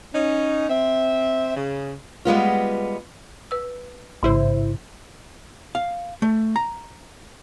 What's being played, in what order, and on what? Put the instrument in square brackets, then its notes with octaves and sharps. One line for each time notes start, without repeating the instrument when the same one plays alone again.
[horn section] C#4 D#4
C4 E5
C#3
[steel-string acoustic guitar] G3 G#3 B3 F4
[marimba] B4 E6
[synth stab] A1 E4 C5 [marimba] G#2 C#3
[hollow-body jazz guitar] F5
A3
A#5